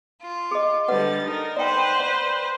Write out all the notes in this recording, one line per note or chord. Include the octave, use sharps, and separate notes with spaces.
F4
G#4 D#5
D3 G3 B4 D5 F#5 A6
D#4 A#4
B4 C5 D5 F#5 G5
D5 F#5